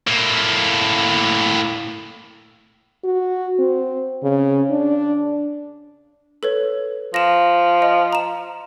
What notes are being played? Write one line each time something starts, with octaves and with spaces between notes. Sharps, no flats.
A2 A#3
F#4
C4
C#3
D4
A4 B4 C#5
F3 A#6 E7
D#5
A#5 E7